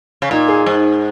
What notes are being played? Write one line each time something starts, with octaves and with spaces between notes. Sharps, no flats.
C#3
A#2 D#4
G#4
G#2